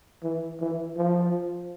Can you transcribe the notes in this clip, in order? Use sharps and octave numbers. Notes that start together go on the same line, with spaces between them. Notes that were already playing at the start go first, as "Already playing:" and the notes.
E3
E3
F3